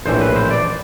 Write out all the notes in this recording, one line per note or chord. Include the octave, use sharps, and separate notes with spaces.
A#1 A2 E3 C5
B4
C5
D5